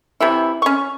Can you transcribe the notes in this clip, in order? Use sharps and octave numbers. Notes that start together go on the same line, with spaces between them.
C3 E3 E4
C#4 C#6